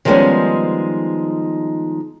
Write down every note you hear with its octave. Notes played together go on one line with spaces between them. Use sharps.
D#3 F3 G3 G#3 B3 C#4